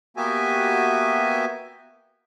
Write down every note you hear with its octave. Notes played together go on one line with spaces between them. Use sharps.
A#3 B3 F#4 G4 E5 G#5